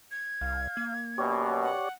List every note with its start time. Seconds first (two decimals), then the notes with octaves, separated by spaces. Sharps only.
0.11 G#6
0.41 C2 F5
0.77 A#3
1.18 F#2 B2 G4 C#5 D5
1.62 F#5